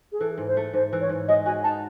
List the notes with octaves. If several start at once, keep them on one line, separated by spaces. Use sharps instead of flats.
G#4
E3 A4
G#2
C5
A3
G#2 C5
E3
C#5
G#2
G#3 D#5
F#4 G#5
D#4 A5